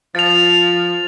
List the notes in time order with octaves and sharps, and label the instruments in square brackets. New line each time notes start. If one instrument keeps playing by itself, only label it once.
[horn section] F3 [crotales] A6 F7